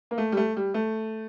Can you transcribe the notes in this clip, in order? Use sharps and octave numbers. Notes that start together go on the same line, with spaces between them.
A#3
A3
G3
A3
G3
A3